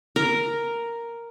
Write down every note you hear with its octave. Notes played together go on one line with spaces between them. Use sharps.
A#4